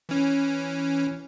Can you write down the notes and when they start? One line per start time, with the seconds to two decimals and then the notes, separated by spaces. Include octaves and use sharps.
0.09 E3 C#4